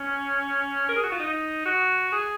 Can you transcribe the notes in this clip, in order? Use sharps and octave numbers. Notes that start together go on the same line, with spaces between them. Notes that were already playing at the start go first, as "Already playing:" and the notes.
Already playing: C#4
A#4
G#4
F#4
F4
D#4
F#4
G#4